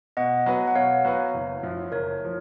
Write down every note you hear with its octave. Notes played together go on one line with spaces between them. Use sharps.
B2 D#5 F#5
F#3 B3 F#4 B4
F#5
B2 C#5 F5
F#3 B3 F#4 B4
F#1
F#2 F3
F#1 A#4 C#5
F3